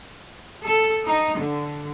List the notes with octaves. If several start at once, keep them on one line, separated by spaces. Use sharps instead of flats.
A4
D#4
D3